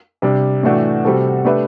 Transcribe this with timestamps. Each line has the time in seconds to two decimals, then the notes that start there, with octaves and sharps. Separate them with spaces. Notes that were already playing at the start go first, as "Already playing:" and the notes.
0.22 C3 G3 D4
0.63 A2 E3 A3 D4 F#4
1.04 C3 G3 C4 F#4 A4
1.45 A3 D4 G4 B4 E5